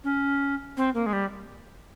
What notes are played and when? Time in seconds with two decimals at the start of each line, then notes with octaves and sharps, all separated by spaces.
0.04 C#4
0.77 C4
0.94 A#3
1.06 G#3
1.13 G3